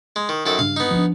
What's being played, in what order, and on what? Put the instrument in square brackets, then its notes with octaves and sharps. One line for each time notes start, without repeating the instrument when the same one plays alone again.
[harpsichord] G#3
D#3
F#2 D#3 A4
[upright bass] G2 C#3 [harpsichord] F5
[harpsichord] B3 D#4
[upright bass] F3 D4